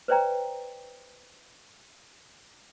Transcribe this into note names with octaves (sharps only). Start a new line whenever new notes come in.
B4 C5 D5 G5 A#5